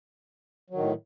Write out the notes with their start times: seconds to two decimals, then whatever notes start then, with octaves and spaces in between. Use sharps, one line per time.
0.70 F#3
0.74 D#3
0.78 A2